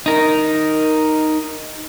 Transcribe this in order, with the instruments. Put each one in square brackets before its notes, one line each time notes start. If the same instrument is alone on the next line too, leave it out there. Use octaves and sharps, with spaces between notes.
[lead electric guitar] D#4 A#4